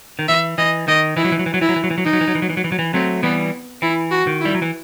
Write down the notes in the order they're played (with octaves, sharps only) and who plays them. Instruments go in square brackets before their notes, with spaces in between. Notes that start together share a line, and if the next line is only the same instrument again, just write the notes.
[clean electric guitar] D#3
[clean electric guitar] E3 [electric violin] E5
[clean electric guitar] E3 [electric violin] D#5
[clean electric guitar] D#3 [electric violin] D#5
[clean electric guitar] E3 [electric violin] E4
[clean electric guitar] F#3
E3
F#3
E3
F#3
[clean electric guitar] E3 [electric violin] E4
[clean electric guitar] F#3
E3
F#3
E3
F#3
[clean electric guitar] E3 [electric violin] D#4
[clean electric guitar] F#3
E3
F#3
E3
F#3
E3
F#3
E3
F#3
E3
[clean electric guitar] F#3 A3 [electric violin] C4
[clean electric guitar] E3 G3 [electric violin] B3
[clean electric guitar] E3 [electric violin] E4
[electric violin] F#4
[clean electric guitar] D#3
[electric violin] E4
[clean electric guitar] G3
F#3
E3